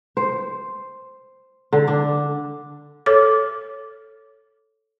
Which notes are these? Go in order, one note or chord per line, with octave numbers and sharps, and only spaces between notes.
C5
D3
D4
A4 C#5 D6